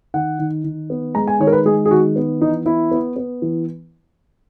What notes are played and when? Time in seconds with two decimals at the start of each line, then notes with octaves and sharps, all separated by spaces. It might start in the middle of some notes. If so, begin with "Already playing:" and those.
0.14 D#3 F#5
0.39 D#3
0.64 D#3
0.90 B3
1.15 G#3 A#5
1.28 G#5
1.40 D#3 C#5
1.47 A#4
1.52 B4
1.66 G#3 G#4
1.86 G#4
1.91 D#3 F#4
2.16 B3
2.41 E3 D#4
2.66 B3 E4
2.91 B3
3.16 B3
3.42 E3